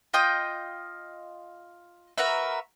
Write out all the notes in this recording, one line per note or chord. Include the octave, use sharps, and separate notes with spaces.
F4 D#5 G5 D#6
F#4 A#4 B4 E5